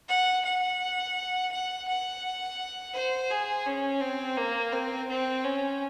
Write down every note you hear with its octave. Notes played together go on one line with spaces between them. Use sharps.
F#5
F#5
F#5
F#5
C5
G#4
C#4
C4
A#3
C4
C4
C#4